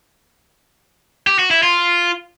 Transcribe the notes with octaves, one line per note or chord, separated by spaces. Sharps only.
G4
F#4
E4
F4